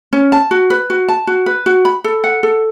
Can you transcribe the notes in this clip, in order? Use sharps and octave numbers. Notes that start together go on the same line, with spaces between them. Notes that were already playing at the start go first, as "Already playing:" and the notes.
C#4
A5
F#4
B4
F#4
A5
F#4
B4
F#4
B5
A4
F#5
A4